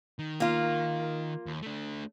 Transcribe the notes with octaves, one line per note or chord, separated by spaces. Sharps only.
D#3
A#3 F4
D#2
A3 D4